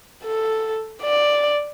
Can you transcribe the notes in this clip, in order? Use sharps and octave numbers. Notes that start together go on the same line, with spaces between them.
A4
D5